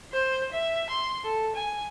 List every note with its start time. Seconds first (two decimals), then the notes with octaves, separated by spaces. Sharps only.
0.12 C5
0.52 E5
0.90 C6
1.24 A4
1.56 G#5